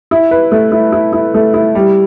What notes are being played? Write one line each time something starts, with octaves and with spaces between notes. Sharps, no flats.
E4
B4
A3
E4
E4
E4
A3
E4
G3